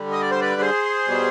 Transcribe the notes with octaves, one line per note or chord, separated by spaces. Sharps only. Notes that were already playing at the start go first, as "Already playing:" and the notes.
Already playing: D3 G3
D#5
D5
C5
B4 D5
G#4 C5
B2 G3